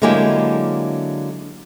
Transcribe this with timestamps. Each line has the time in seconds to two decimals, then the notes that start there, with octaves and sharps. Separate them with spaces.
0.02 D3 F#3 G#3 A#3 E4 G4